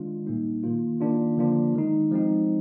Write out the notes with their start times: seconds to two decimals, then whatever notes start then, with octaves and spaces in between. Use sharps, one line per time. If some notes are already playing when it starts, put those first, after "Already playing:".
Already playing: D#3 G#3 D4 F4
0.27 A#2 G3 A#3 D#4
0.64 D#3 A#3 F4
1.00 D#3 A#3 D4 F4
1.37 D3 F3 A#3 D4 F4
1.74 D#3 G#3 D#4
2.11 F3 G#3 C4 D#4